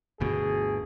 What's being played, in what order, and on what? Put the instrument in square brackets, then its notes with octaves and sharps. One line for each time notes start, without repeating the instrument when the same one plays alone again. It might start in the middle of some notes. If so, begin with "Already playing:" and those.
[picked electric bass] G1 D2 B2 [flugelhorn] G#4